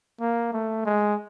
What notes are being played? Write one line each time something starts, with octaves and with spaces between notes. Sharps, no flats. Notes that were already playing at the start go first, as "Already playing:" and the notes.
A#3
A3
G#3